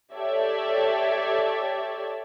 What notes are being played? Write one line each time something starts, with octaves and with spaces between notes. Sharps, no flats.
G4 A4 C#5 D5 E5